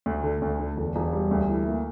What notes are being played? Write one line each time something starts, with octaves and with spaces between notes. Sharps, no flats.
D2
D3
D2
D3
E1
E1
G3
D2
E3
A#3